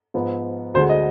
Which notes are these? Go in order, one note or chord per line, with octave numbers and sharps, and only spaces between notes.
G#2 F3 B3
D2 D3 G#3 C5
D#5